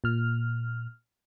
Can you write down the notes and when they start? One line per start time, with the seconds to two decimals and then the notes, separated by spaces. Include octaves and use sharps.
0.04 A#2 F6